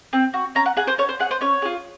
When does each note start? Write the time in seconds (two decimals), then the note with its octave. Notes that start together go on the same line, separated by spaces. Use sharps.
0.13 C4
0.34 F#4
0.55 C#4 A#5
0.66 F#5
0.77 G#4 F#5
0.88 C5
0.98 C#4 C#5
1.09 C5
1.19 G#4 F#5
1.31 C5
1.41 C#4 C#5
1.62 F4 G#4